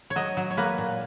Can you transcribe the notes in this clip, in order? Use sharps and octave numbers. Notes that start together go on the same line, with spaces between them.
C#5
F#3 D#5
F#3
C#5
A#3 B4
A#2